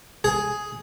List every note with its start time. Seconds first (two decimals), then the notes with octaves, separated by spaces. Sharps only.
0.24 G#4